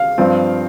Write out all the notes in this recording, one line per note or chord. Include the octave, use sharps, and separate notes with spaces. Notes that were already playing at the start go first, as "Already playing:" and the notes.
Already playing: F5
G2 F3 C4